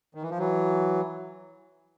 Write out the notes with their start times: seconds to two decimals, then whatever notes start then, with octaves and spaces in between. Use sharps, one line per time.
0.15 D#3
0.22 E3
0.30 F3
0.38 E3 F#3